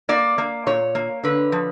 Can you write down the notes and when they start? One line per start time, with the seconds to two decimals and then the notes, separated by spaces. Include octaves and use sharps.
0.09 A#3 D5
0.38 A#3
0.66 A#2 C#5
0.95 A#3
1.23 D3 B4
1.52 F3